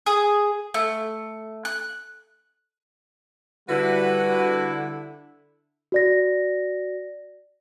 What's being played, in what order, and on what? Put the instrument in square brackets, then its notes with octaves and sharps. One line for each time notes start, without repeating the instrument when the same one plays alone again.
[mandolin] G#4
A3
F#6
[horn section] D3 E4 [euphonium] G3 [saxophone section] F#4 B4
[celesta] F#4 D5 A#6